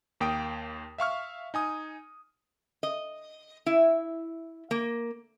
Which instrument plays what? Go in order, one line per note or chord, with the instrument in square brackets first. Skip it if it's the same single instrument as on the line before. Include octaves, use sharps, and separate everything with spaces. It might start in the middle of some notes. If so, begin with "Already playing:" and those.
[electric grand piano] D#2 A#3 G5 D#6 D7
E5 F5 C#6 F6
D#4 G#5 D#6
[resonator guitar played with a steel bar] D#5
E4
A#3